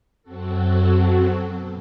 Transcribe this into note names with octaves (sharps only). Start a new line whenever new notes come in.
F#2 F#3 C4 F#4 A4
B2